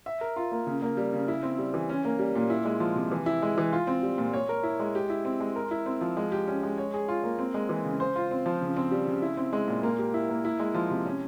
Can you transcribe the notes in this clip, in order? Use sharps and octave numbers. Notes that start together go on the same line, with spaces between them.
E5
A#4
F4
A#3
C#3
A#3
G3
C#3
E4
C4
G3
E3
C#4
A#3
G3
A#2
E4
G#3
F3
C3
E3
E4
G#3
E3
F4
C4
G3
A#2
C#5
A#4
E4
G#3
G4
E4
C4
G#3
A#4
E4
C4
F3
G#3
G4
C#4
G#3
C#5
G#4
F4
A#3
C4
G#3
E3
C#3
C5
F4
C4
F3
C#3
C4
G3
C#3
E4
C4
G#3
A#2
A#3
G4
E4
A#3
E4
G#3
F3
C3
C#4